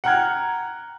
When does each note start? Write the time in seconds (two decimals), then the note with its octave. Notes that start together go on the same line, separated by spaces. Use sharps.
0.04 F#5 G5 A#5 F6 F#6 G#6